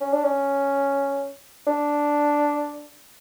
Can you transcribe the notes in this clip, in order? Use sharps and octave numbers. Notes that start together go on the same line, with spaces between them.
C#4
D4
C#4
D4